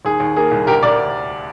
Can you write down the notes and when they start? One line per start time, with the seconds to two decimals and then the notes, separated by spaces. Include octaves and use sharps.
0.05 D#2 G#4
0.20 D#2
0.36 A#3 G#4
0.51 C2
0.67 D2 G4 A#4
0.83 D2 A#4 D5